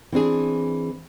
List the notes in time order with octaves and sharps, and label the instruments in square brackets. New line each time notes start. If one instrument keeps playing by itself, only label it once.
[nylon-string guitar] E3 C4 D4 G#4